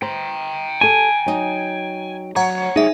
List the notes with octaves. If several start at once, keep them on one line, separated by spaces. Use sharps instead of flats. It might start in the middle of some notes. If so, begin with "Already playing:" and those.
C5 G5 A#5
G4 A4 G#5
F#3 D#4
D2 F#3 C#5 F#5 A#5
G3 D#4 G#4 E5